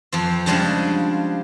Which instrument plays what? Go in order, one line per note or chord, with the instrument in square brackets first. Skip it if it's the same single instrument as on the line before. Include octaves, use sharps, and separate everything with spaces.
[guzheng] F2 F3 C4
C#3 F3 G3 G#3 D4 F#5